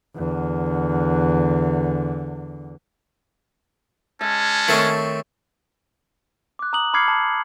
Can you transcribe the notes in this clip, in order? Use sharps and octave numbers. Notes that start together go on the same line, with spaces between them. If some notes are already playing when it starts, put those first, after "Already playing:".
E2 D3
G#3 C#4 E5 A5
D#3 A3 C4 C#5 G5
D6 F#6
A#5 D#6 F#7
B5 D6 F6 G#6 C7 C#7
A5